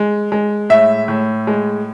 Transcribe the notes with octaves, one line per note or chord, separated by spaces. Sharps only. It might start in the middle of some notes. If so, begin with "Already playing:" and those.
Already playing: G#3
G#3
A2 E5
A2
G#3